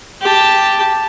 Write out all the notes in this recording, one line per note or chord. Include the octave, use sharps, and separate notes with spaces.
G4 A5